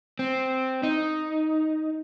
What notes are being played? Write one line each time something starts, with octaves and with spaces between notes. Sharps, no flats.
C4
D#4